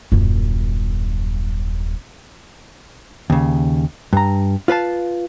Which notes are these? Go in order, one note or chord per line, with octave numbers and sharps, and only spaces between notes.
D#1 F#2
D#2 C#3
G2 A#5
F4 B4 F5 A5